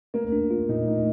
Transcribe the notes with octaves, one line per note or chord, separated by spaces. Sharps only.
A3 A#3
D4
F4
A#2 D#4
A3 D#4